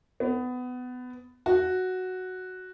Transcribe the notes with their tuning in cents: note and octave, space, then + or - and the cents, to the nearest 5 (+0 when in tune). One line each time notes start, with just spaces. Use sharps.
B3 +20
F#4 +0